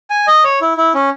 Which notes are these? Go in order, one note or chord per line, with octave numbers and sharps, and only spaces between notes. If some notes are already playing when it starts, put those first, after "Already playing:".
G#5
D#5
C#5
E4
E4
C#4